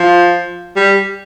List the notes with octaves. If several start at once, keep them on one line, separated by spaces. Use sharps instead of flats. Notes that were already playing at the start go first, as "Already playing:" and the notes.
Already playing: F3
G3